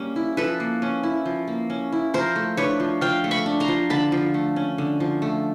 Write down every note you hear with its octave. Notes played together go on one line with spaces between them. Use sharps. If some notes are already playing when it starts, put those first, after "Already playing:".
Already playing: G3 A#3 C#4
E4
F3 A4 B4
A#3
C#4
E4
F3
A#3
C#4
E4
F3 A#4 C5
A3
D4 B4 C#5
F3
F3 F5 G5
A3
B5 C#6
D4
A#5 C6
F3
D3 A5 B5
F3
A3
C#4
D3
F3
A3